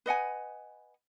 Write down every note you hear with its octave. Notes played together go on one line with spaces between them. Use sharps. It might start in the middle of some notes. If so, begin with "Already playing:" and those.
B4 D#5 F#5 G#5